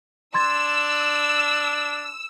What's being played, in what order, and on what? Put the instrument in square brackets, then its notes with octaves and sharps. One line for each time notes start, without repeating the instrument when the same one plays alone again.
[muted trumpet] D4 [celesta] C6 G#6 A6 [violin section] E6